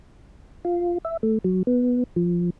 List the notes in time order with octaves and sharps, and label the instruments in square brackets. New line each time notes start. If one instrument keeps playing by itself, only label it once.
[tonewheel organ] F4
E5
A3
F#3
B3
F3